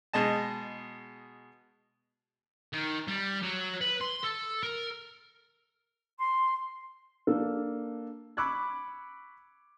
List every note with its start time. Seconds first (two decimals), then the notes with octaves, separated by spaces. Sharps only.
0.13 B2 G#3 D#5 A5
2.73 D#3
3.08 G3
3.43 F#3
3.81 B4
4.01 C6
4.24 A4
4.63 A#4
6.19 C6
7.27 A#3 D4 A4
8.37 B5 C#6 D6 E6 F#6 G#6